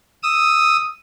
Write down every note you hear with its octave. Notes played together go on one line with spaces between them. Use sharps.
D#6 E6